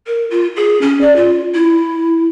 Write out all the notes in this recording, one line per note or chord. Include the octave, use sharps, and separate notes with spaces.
A#4
F4
G#4
C#4
D5
F4
E4